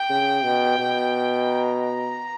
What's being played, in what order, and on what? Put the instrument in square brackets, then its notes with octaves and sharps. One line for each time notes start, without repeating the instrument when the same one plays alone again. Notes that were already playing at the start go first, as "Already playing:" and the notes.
Already playing: [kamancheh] G5
[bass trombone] C#3
B2
B2
[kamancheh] A#5